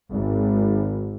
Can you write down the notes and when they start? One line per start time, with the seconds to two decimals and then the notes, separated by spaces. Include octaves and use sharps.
0.11 G#1